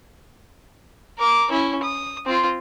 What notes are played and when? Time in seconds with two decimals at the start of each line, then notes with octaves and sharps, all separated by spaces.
1.19 A#4 D6
1.51 C#4 E4
1.83 D#6
2.26 C4 F4